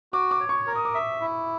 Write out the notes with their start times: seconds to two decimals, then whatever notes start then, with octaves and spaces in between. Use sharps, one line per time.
0.13 F#4 D6
0.31 D6
0.40 C#5
0.49 C#6
0.67 A#4
0.76 D#6
0.85 D6
0.94 E5 D#6
1.21 E4